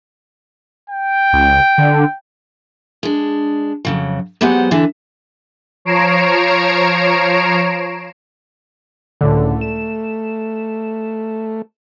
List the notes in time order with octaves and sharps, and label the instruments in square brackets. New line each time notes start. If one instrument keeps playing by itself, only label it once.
[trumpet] G5
[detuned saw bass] C#2
D3
[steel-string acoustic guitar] G#3 D4
F2 C#3 F#3
F#3 G#3 B3 G4 C5 F#5
D3 E3 D4 A4
[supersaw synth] F3 C#5 A#5 C7 D7 E7
[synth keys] C#2 A2 D3 [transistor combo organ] A3
[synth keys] E7